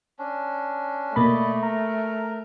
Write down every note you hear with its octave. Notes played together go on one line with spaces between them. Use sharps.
C#4 D4
B2 A3 A#3 D5 D#5 B5
A#4 A#5